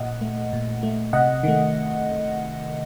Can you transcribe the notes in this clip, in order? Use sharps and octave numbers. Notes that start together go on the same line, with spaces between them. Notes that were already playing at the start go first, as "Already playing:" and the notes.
Already playing: A#2 D#5 F#5
A3
A#2
A3
C3 D#5 F#5
D#3 A3